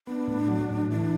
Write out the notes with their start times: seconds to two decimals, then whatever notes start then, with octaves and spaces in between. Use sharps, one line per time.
0.07 B3 D4
0.28 A2
0.48 F#3
0.70 A2
0.91 E3 D4